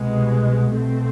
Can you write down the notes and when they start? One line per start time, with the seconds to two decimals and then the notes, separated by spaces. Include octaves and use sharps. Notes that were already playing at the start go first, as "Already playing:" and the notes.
Already playing: C2 B2 G#3 B3
0.73 B2 A3 C4